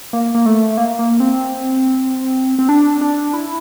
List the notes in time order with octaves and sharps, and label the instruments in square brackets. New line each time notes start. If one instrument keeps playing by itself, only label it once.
[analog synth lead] A#3
A#3
A3
A#3
A#3
C4
C4
D4
D4
E4